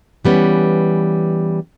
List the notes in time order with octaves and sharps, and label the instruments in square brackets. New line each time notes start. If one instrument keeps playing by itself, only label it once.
[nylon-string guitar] E3 G3 B3 C#4